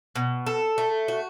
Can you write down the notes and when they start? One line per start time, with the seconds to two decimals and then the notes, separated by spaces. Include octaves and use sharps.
0.15 B2
0.46 A4
0.78 A3
1.08 F#4